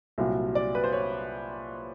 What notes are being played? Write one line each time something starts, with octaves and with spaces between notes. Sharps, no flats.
C2 A#2 F#3
D5
B4
C5
C#5